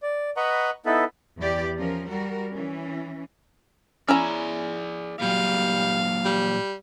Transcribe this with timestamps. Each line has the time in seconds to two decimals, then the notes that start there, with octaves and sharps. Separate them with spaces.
0.02 D5
0.37 B4 D#5 F#5 A#5 B5 C#6
0.86 B3 D#4 E4 A4 B4
1.38 E2 E3 G4 D5
1.77 F3 C#4 A#4
2.08 G3 F#4 A#4
2.52 E3 C#4
4.08 C#4 E4 G#4 D5 A#5
5.21 A#2 F#3 G3 F5
6.25 G3